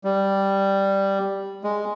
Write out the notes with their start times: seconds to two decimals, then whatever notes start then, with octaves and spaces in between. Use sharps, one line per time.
0.04 G3
1.64 G#3